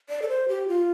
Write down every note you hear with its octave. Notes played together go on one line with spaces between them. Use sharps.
D5
A4
C5
G4
F4